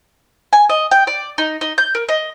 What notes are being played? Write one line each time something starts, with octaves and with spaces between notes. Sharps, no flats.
G#5
D#5
G5
D5
D#4
D#4
G6
A#4
D#5